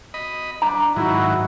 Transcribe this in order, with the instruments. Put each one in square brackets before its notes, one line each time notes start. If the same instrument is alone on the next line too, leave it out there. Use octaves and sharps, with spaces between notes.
[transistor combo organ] D#5 B5
[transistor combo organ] D4 [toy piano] A#5
[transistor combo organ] G#2 D#3 F#3 [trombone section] D#4 E4 F#4